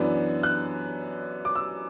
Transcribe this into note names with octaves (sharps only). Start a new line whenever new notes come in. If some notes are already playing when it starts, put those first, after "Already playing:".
Already playing: F#2 E3 B3 D4
F#6
D6
E6